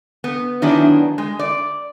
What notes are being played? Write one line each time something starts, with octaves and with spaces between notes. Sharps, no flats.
B3
D#3 F#3 B3 D4 E4 G#4
G#3
D5